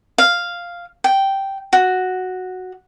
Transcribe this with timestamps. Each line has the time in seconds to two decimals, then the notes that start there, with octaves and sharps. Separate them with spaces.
0.18 F5
1.04 G5
1.73 F#4